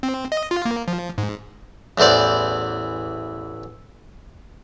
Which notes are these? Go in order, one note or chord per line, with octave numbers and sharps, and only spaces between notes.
C4
D#5
F4
A#3
F3
G#2
A1 E2 E3 C5 D5